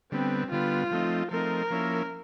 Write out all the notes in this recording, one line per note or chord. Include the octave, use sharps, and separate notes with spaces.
D3 G3 B3 C4
D3 G3 B3 F4
F3 A3 C4 D#4
F3 A3 C4 D#4 A#4
F3 A#3 C#4 E4